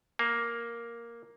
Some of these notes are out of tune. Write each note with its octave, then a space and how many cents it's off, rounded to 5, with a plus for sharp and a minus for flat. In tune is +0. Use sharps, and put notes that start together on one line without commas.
A#3 +5